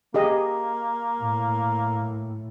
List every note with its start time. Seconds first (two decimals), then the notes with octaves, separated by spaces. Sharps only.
0.14 A#3 G4 G#4 D#5
1.19 A2